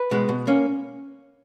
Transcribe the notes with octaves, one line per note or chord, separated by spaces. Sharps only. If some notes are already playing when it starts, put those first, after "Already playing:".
Already playing: B4
B2 G#3 B3
B2
A#3 C#4